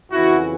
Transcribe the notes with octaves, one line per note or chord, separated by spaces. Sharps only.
F2 C#3 E3 E4 F#4